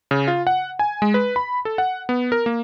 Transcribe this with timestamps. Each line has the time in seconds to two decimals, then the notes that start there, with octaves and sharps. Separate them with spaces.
0.11 C#3
0.28 F4
0.47 F#5
0.79 G#5
1.02 G#3
1.14 B4
1.36 B5
1.65 A4
1.78 F#5
2.09 B3
2.32 A#4
2.46 A#3